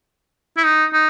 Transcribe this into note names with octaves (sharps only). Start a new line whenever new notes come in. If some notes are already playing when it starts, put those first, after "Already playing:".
E4
D#4
D#4